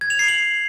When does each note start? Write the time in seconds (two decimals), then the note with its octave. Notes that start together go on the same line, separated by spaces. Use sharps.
0.01 G#6
0.10 F7
0.19 C7
0.28 F#7